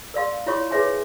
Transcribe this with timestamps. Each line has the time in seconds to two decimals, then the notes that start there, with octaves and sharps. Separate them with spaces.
0.14 A#4 D5 F5 C6
0.46 E4 F4 C#5 C6 C#6
0.71 G#4 B4 C#5 E5 G#5 C6